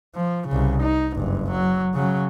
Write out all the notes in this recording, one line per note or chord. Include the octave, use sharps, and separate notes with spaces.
F3
C2 C#3
D#4
F#1 G2
F#3
C#3 F#3